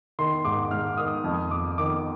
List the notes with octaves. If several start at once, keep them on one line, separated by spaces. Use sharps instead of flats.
D#3 C6
G#2 D6
G#2 F6
D#3 D#6
F2 D#6
F2 D6
D#3 D6